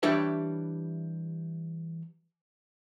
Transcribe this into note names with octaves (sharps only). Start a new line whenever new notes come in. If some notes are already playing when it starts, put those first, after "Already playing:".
E3 G3 D4 G4 C#5 E5